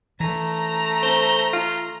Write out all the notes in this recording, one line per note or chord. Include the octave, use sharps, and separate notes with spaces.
E3 A3 A#5
C5
F4